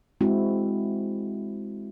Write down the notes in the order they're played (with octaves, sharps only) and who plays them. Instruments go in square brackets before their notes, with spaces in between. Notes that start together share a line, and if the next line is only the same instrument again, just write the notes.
[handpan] G#3 C4 E4 F#4